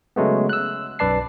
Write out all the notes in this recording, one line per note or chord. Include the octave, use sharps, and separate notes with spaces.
C#3 F#3 G#3 A3 B3
E6 F#6
B1 F#2 B4 D5 A5 C7